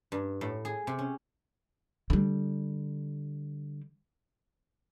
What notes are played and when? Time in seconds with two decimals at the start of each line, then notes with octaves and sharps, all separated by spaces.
0.12 G2
0.41 A2
0.65 G#4
0.87 C3
0.99 C#4
2.10 D3 G3